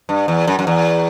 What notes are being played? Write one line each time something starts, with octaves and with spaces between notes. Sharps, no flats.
G2
E2
F#2
F#2
E2